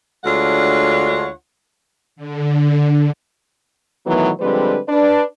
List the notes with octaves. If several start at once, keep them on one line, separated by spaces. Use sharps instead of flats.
D2 G#3 D4 F4 C#5 F#5
D3
B2 D#3 E3 F#3 A3 B3
D3 F3 G3 G#3 C4 B4
D4 B4 D5